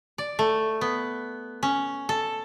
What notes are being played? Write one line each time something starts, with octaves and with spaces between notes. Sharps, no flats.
D5
A3
B3
C#4
A4